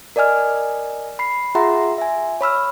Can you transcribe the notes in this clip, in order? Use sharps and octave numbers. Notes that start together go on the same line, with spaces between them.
A#4 D5 D#5 G#5 F6
B5 C7
F4 G#4 E5 F#5 A#5 C6
E5 G#5
C#5 B5 E6 F6